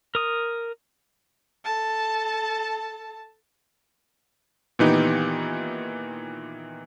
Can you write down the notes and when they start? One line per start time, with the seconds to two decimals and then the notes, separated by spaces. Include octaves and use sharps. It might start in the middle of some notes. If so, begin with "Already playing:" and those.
0.15 A#4 D#6
1.64 A4 A5
4.79 A#2 D#3 E3 B3 D#4 G4